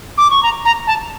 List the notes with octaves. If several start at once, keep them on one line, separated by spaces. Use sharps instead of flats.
D6
C#6
A#5
A#5
A5